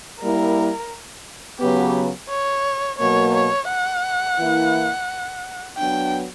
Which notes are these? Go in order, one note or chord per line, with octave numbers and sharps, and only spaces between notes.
G3 A#3 E4 A#4
C#3 F#3 B3 G4
C#5
B2 F#3 A#3 C#5
C#5
F#5
E3 A#3 E4
F#3 B3 D4 G5